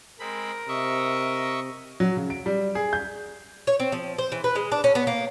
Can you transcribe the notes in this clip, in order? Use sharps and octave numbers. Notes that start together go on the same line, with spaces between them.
G#3 C4 A#4 B5
C3 D#5 E5 C#6
F#3
C#3
D7
G3
G#4
G6
C#5
C4
F3
C5
E3
B4
G#3
D4
C#4
B3
A#3